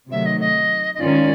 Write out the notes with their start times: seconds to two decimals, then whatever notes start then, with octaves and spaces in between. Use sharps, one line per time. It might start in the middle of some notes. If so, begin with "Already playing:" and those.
0.11 C3 D#3 F#3 A3 E5
0.25 D#5
0.40 D#5
0.94 D#5
0.99 D#3 G#3 C#4 F4 D5